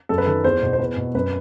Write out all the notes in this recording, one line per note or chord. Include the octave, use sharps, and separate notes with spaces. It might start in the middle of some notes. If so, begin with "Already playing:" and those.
F#2 A4
B4
D#3 A4
E2 C5
B2
C5
E2 B4
B2
F#2 B4